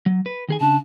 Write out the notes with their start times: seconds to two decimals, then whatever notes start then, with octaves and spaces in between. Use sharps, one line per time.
0.06 F#3
0.26 B4
0.49 D#3 G#4 G#5
0.61 C#3 D4 A5